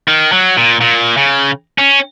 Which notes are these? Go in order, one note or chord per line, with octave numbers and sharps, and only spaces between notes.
D#3
F#3
A#2
A#2
C#3
C#4